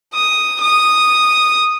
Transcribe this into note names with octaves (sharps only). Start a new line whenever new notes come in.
D#6
D#6